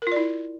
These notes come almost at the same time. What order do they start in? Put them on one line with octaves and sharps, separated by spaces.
A#4 F4 D5 E4